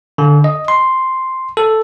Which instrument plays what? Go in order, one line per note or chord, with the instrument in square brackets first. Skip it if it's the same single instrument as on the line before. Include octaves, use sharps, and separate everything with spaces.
[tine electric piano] D3
D#5
C6
A4